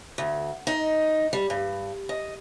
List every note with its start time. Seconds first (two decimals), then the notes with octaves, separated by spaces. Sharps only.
0.18 D2
0.67 D#4
1.33 G3
1.50 G2
2.09 D#5